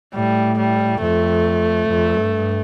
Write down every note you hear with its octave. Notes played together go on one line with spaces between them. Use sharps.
A2 G3
G3
F2 A3
F2
G2